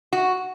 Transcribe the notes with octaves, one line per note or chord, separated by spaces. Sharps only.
F#4